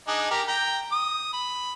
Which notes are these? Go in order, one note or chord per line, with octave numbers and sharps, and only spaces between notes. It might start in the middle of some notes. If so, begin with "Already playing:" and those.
D4 D#4 G#4
G4 A#4
G5 A#5
D#6
B5